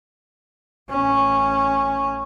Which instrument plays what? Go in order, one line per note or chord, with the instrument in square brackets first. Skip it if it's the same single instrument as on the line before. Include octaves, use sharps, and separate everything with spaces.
[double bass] A1 C#4